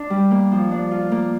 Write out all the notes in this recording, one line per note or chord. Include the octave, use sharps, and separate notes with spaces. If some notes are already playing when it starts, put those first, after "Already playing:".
Already playing: D4
G3
A#3
F3
D4
F4
A#3